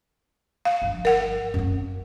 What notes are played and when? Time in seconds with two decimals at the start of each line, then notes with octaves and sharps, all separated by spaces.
0.65 F5
0.82 G1 F3
1.05 A#4 F#5
1.54 F#2 C#4